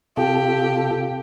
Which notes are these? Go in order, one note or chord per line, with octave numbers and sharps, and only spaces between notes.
C3 F4 G4 A4